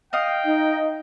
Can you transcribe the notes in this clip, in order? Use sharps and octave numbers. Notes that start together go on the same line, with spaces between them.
D#5 F5 G5 D#6
D#4